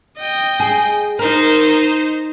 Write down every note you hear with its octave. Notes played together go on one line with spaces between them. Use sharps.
D#5 G5
G#4
D#4 A#4 C5